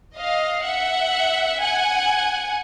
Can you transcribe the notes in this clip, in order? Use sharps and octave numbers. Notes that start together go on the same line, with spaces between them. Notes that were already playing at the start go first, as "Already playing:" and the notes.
D#5 F5
E5 F#5
F#5 G#5